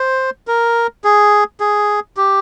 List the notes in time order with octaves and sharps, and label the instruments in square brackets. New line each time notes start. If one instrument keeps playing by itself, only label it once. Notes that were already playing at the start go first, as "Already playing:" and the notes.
Already playing: [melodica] C5
A#4
G#4
G#4
G4